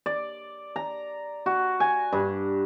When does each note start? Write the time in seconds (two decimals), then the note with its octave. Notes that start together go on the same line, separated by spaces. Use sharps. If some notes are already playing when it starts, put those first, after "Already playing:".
0.06 D5
0.76 A#5
1.46 F#4
1.80 G#5
2.13 G2